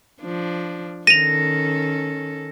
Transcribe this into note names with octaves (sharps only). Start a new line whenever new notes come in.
F3 D4
D#3 C#4 A4 A#6 D#7 F7